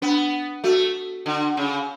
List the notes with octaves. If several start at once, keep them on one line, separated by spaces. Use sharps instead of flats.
B3 D4
A3 F#4
D3
C#3